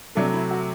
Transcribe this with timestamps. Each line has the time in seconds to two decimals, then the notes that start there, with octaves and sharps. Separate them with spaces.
0.15 C3 F#3 A3 D4
0.33 E4
0.51 F#4